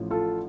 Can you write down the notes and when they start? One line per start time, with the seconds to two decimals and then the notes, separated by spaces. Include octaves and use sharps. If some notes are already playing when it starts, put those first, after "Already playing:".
Already playing: A1 A2 F3
0.11 F4 A4